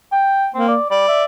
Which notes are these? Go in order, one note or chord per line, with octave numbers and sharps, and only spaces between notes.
G5
A#3 C4
D5
G3 D5
E5